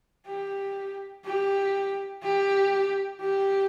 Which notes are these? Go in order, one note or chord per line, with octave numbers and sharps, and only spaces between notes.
G4
G4
G4
G4